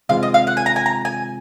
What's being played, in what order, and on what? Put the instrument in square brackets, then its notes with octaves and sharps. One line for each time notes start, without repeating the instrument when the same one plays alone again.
[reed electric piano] C3 D#3 G#3 C4 F4 [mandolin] F5
[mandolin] D#5
F5
F#5
G#5
A#5
G#5
A#5
G#5